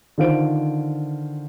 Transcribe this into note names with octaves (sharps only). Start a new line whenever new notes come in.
D3 D#3 F4 C5 D7